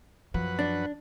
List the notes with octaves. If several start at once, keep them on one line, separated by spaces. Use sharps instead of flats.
F#2 F3 B4 F#5
D4